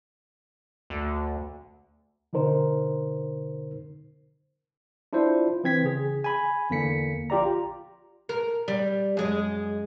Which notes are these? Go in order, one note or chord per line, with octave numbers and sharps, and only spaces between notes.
D2
B2 D3 D#4 A#4 C5
D4 E4 F4 C5 D5
E3 C4 G#6 B6
C#3 G#4
G#5 B5
E2 D3 A#3 B6 C#7
A#1 F4 G4 D5 A#5
A#4
G3
F#2 G#3